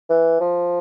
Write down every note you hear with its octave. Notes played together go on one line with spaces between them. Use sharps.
E3
F3